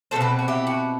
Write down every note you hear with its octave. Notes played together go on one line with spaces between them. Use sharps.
B2 A3 C4 A4 C5
G4 B4
F#4
E4 G4
F#4